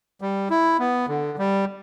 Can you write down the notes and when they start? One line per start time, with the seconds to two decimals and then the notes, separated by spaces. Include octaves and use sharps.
0.21 G3
0.50 E4
0.79 B3
1.09 D3
1.38 G3